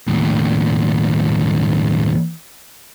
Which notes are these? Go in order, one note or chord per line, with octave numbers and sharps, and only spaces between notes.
D#2 A2